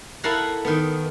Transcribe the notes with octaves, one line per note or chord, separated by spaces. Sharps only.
E4 A4 A#4 F5 F#5 G#5
D#3 B3